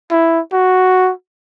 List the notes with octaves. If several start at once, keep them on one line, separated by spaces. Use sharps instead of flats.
E4
F#4